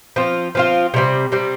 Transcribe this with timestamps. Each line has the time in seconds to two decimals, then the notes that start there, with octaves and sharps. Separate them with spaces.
0.16 F3 C4 F4
0.55 F3 C4 F4
0.94 C3 G3 C4
1.32 C3 G3 C4